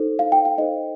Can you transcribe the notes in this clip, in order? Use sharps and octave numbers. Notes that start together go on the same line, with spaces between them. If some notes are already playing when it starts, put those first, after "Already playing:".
Already playing: D#4 A4 C5
F5
G5
F5
D#4 A4 C5 D#5